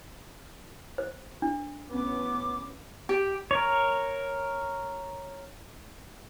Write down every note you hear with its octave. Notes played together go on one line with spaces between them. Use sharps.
C5
D4
A1 B3 C#4 D6
G4
A#4 C#5